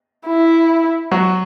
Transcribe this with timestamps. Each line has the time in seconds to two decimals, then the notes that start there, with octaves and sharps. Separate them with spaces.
0.27 E4
1.11 F#3 F#4